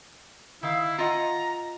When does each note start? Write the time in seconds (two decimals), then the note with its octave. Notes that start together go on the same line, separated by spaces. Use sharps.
0.63 D#3 E4 F5
0.98 F4 D#5 F#5 A#5